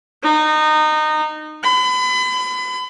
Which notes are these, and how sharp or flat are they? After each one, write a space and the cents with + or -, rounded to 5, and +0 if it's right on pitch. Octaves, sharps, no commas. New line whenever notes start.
D#4 -20
B5 +35